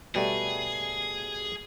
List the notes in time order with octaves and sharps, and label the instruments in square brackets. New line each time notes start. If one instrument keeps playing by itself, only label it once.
[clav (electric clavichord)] B2 G3 A3 [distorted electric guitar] G#4